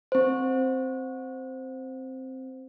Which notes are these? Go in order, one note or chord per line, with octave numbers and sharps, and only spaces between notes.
C4 C5